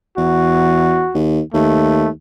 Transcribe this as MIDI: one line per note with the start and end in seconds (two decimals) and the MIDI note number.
0.17 1.07 40
0.17 1.24 66
1.14 1.40 39
1.54 2.09 39
1.54 2.08 57